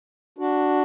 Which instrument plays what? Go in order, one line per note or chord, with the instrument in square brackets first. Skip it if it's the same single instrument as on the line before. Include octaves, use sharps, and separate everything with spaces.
[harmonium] D4 F#4